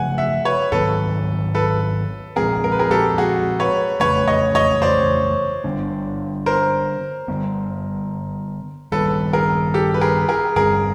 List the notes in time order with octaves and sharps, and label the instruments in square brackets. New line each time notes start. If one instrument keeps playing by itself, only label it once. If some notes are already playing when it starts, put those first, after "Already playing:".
Already playing: [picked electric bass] C#3 F3 A3 [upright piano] F#5 G#5
[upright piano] E5 F#5
B4 C#5
[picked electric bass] G#2 D#3 F#3 B3 [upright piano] A4 B4
[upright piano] A4 B4
[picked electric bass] A#2 F3 G#3 C4 [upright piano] G#4 A#4
[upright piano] A#4
B4
G#4 A#4
G4 A4
F#4 G#4
B4 C#5
[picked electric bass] F2 C#3 E3 A3 [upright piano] B4 C#5
[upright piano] C#5 D#5
C#5 D#5
C5 D5
[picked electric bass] D3 G3 B3 D4
[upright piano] A#4 C5
[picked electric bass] D3 G3 B3
[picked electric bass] G2 D#3 G3 [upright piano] A4 B4
[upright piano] G#4 A#4
G4 A4
B4
G#4 A#4
G#4 A#4
[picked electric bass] G2 D3 G3 C4 [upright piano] G#4 A#4